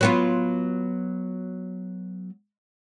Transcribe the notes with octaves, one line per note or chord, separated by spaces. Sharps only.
F#3 B3 F4